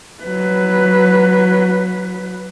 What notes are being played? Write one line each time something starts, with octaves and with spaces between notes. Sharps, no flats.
F#3 B4